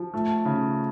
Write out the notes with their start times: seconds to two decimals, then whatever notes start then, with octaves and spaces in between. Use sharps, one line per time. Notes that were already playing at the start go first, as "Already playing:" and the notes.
Already playing: F3
0.14 A3
0.45 C#3